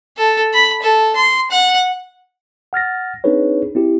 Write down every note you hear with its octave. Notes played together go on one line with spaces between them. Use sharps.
A4
B5
A4
C6
F#5
F#5 F6 A6 A#6
C4 D4 D#4 G#4 B4 C#5
C4 E4 G4